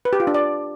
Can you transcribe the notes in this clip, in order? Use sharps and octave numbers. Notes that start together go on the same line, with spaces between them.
B4
G4
F4
D4
D5